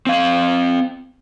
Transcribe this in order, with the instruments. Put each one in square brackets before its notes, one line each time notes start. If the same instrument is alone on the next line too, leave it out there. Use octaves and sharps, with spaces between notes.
[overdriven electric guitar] C4 F5